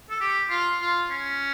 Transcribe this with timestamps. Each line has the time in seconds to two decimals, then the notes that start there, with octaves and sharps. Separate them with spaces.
0.10 A4
0.20 G4
0.49 F4
0.80 F4
1.10 C#4